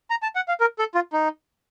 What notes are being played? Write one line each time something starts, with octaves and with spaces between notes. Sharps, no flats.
A#5
A5
F#5
F5
A#4
A4
F4
D#4